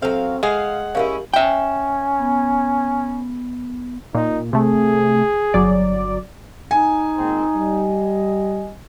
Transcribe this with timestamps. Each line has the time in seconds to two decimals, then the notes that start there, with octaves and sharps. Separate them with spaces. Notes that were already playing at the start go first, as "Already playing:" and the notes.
0.02 F#3 C4 A4 F5
0.43 G#3 G#4 F5 F#5
0.95 C#4 D#4 E4 G4 A#4 F5
1.34 C#4 E5 G5
2.19 B3
4.15 A#2 D#4
4.53 C3 A3 G#4
5.54 G1 F#3 D5
6.71 D#4 G#5
7.17 A#2 G#3 C4
7.55 G3 D#5